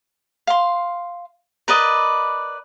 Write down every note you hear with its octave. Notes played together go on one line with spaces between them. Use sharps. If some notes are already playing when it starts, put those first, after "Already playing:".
F5 C6
A#4 B4 D5 D#5